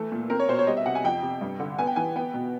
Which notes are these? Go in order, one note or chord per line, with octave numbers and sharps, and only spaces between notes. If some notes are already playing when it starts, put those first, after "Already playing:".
Already playing: E3 A3 A4
A#2
C4 A#4
C#5
B2 C5
C#5
G3 D#5
E5
C3 F#5
G#5
F2 G5
C3
G2
D3
B3 G#5
G5
E3 G#5
B3 G5
B2